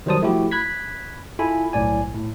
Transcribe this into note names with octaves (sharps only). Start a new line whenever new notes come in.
D#3 F#3 G3 C5 A5 D#6
F3 A3 E4 F#4 G4
B5 F#6 G#6 B6
E4 F4 A4 G#5 B5
B1 A2 D5 G#5
A2